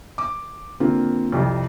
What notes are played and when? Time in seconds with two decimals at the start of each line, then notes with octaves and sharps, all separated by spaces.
0.18 D6
0.80 D3 A#3 C4 F4
1.32 C2 F2 G3